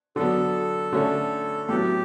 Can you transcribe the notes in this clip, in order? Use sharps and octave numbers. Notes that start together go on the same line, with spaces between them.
D3 F#3 B3 A4
D3 A3 C#4
A2 F#3 B3 G4